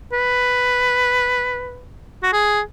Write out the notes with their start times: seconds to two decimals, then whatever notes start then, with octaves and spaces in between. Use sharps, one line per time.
0.13 B4
2.23 F#4
2.33 G#4